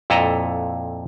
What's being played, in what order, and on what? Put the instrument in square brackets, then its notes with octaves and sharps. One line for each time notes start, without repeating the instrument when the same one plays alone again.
[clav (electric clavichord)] F2 A#2 E4 A4 D#5 A#5